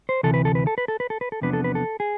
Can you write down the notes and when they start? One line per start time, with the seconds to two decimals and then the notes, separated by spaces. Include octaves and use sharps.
0.09 C5
0.23 D2 C3 E3 A4
0.34 B4
0.45 A4
0.55 B4
0.67 A4
0.78 B4
0.88 A4
1.00 B4
1.10 A4
1.21 B4
1.32 A4
1.41 E2 C3 F3 B3 D4 B4
1.53 A4
1.64 B4
1.75 A4
2.00 G#4